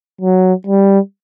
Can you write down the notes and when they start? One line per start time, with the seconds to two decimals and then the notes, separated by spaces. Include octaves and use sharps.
0.21 F#3
0.67 G3